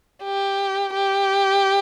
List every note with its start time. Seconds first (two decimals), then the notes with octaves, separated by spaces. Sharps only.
0.24 G4
0.94 G4